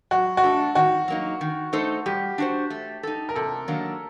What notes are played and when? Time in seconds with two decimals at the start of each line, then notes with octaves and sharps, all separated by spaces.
0.11 F#3 F#4
0.37 F#4
0.43 A3 D4 A4
0.75 D#3 F#4
1.08 F#3 A#3 D#4
1.41 D#3
1.73 A3 D#4 A4 C5
2.06 G3 G4
2.38 D4 F#4 C5
2.70 A3
3.03 D#4 A4
3.29 A#4
3.36 C3 A4
3.68 D#3 F#3 A#3 D4